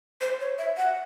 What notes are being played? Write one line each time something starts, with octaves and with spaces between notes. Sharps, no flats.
C5
C#5
E5
F#5